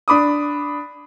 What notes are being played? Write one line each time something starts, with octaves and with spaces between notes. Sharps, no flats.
D4 B5 D6 D#6